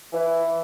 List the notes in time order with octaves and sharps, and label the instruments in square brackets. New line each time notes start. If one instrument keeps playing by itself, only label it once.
[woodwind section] E3